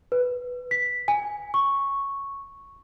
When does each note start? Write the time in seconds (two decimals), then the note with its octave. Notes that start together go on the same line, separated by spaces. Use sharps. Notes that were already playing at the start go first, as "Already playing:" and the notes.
0.12 B4
0.71 B6
1.08 G#5
1.54 C#6